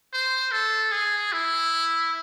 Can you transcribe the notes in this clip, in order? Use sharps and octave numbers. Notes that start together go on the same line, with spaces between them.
C5
A4
G#4
E4